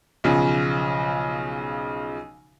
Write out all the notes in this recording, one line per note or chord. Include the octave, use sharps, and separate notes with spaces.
B1 C#3 F3